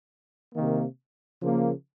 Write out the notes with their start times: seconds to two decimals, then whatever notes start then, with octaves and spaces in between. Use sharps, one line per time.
0.54 C3 D#3 A#3
1.41 C#3 F3 A#3